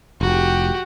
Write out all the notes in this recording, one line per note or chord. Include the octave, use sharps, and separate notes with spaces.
F1 F#4 G4